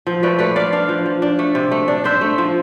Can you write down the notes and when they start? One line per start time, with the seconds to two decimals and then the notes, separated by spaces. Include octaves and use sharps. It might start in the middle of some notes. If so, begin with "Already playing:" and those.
0.07 F3
0.23 A3 B4 D5
0.39 A3 B4 D5
0.56 D4 D5 F5
0.72 D4 D5 F5
0.89 F3
1.06 F3
1.22 D4
1.39 A3
1.55 C3
1.72 A3
1.88 D4
2.04 D4 C5 E5
2.21 A3
2.38 F3